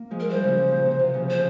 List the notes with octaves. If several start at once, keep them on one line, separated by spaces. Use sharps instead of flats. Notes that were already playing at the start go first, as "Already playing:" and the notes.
Already playing: A#3
F3 G#3
A#4
E3 G3 C5
C#3 F3
C#3
A#2
C3
C3 E3
C#3 F3
C#3 F3 C5